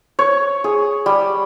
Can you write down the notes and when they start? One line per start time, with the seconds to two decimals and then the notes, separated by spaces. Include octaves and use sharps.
0.19 C#5
0.64 G#4
1.06 G3